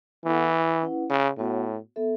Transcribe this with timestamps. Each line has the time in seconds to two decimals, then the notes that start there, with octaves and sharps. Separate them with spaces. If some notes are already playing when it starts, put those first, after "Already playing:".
0.25 E3 B3 E4 A4 F#5
0.82 C#4 E4 B4 F#5
1.10 C#3
1.38 A2 B3 F#4 C#5 F#5
1.96 B3 A4 E5